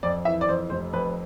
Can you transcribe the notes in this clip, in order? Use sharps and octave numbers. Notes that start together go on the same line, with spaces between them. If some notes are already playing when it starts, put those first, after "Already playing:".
F2 D5
E3 E5
D5
F2 C5
F1 C5
F2 B4